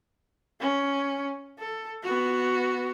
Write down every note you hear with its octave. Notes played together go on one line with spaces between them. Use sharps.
C#4
A4
B3 F#4